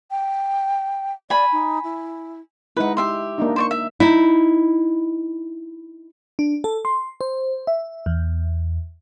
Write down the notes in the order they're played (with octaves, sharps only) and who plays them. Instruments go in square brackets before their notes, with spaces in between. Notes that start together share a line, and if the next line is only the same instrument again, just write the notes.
[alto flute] G5
[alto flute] D5 [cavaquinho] G#5 B5
[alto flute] D#4
E4
[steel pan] G#3 D#4 E4 [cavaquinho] B4 F#5
[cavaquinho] G4 E5 C6
[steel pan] A#3 D4 D#4
[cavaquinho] C5 D5 C#6
E5
[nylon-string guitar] D#4 E4
[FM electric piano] D4
A4
C6
C5
E5
E2